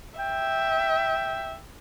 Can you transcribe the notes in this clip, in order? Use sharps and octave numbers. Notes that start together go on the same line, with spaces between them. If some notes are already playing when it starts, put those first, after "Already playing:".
E5 G5